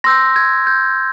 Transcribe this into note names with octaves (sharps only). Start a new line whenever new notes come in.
C6 E6 G6 A#6
G#6
G6